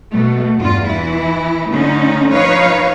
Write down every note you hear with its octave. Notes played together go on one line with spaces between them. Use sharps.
B2 A3
E2 G2 F4
E3 E4
D3 A3 C#4 D#4
F3 D#4 B4 C#5 F5